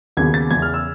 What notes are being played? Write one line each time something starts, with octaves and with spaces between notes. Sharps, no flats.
D#2 C#3 F#3 B3 G#6
A6
E2 C#3 E3 G#6
F6
E6